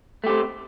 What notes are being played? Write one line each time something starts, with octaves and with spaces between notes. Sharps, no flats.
A3 C4 G4